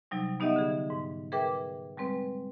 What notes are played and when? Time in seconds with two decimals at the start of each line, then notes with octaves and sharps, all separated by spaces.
0.11 C3 F#3 G3 D#4
0.40 B3 D#4 G4 D#5 E5 F#5
0.56 D3 G#4
0.90 G#2
1.32 G#4 A#4 B4 E5 G5 D6
1.97 G3 G#3 C4 B4